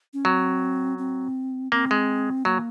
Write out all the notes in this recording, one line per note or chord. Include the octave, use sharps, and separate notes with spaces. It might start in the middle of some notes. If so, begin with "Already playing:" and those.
C#4
F#3 C4
C4
A#3 C4
G#3
F#3 A#3